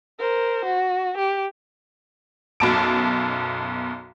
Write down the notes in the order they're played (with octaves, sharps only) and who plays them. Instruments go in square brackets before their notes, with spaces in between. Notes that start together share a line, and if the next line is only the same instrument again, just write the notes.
[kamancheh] A#4 C5
F#4
G4
[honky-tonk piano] B1 F#2 B2 A5 D6 D7